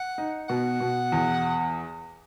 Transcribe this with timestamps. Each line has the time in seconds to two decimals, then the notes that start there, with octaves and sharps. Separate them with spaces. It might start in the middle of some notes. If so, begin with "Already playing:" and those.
Already playing: F#5
0.18 D#4
0.49 B2 F#5
0.80 B2
1.12 E2